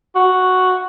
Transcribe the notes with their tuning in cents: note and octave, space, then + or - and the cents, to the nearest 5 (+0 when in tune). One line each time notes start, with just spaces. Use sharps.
F#4 +0